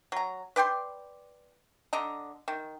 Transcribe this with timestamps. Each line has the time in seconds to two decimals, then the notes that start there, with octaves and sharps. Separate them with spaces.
0.12 F#3 A#5
0.56 B4 D5 G5 C6
1.93 D3 D#5 A#5
2.48 D#3